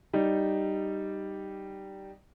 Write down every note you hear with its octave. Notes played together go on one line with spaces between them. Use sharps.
G3 D#4